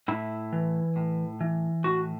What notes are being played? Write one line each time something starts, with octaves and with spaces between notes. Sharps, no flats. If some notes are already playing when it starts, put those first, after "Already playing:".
A2 E4
E3
A2
E3
A2 F#4